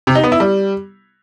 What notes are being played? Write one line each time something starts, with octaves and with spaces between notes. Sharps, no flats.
C3
D#4
B3
E4
G3